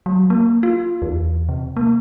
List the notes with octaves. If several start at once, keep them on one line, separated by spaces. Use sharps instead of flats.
F#3
A#3
F4
E2
C3
A#3